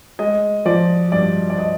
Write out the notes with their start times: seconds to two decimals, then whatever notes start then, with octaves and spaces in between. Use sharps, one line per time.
0.19 G#3 D#5
0.66 F3 D5
1.12 G2 D5
1.50 D5
1.59 D#5